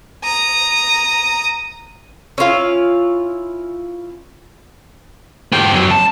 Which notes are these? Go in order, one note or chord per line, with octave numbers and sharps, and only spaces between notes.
A#5 D#6
C#4 E4 F4 F5
B3 G4
F#2
A5